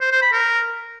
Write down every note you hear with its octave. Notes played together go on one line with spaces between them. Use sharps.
C5
C5
B5
A#4